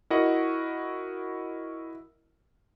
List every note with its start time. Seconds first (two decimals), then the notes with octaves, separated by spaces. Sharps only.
0.10 E4 F#4 A#4 D#5 F#5